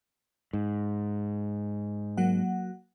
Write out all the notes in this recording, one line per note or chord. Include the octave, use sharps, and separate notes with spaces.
G#2
F#3 A#3 F#5